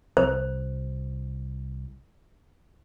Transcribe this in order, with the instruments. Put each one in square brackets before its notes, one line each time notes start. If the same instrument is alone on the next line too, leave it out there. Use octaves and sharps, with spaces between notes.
[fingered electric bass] C2 [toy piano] C5